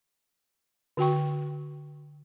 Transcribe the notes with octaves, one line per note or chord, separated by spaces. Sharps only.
D3 F#4 G5 C#6